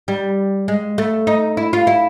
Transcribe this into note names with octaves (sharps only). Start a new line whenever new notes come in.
G3
G#3
A3
D#4
E4
F4
E4